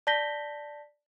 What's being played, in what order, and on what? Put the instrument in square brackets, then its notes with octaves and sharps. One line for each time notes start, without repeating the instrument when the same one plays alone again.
[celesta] D5 A5 G6 A#6 B6 G7